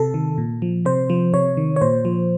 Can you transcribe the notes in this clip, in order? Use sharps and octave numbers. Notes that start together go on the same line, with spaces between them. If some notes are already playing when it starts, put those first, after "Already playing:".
Already playing: C3 A4
D#3
A#2
F3
C3 C5
F3
C3 C#5
D#3
C#5
A#2 C5
F3